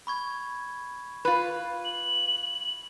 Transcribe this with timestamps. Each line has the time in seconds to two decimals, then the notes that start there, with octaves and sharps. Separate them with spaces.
0.07 B5 C#6 G#6
1.25 F4 B4
1.84 F#7